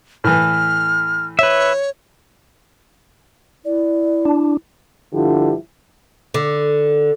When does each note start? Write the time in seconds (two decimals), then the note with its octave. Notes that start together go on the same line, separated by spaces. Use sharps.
0.24 A2 E3 F6
1.39 B4 C#5 E5
3.65 E4 D5
4.25 D4
5.13 G2 D3 F3 E4 F4 G4
6.34 D3